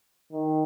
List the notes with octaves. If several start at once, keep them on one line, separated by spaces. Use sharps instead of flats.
D#3